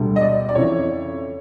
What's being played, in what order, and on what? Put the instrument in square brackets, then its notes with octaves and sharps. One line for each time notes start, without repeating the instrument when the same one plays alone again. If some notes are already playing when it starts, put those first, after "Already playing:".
Already playing: [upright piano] E1 D2 D3 G3
D#5
D5
D5
F2 C#3 E3 C#5